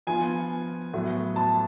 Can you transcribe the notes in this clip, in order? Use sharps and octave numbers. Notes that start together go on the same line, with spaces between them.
F3 B3 F4 G#5
A2 F#3 B3
A5